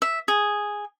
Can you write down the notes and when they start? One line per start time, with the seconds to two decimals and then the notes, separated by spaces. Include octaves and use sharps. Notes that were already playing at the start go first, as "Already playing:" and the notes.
0.02 E5
0.28 G#4